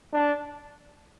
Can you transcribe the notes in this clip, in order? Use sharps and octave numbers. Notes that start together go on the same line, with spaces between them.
D4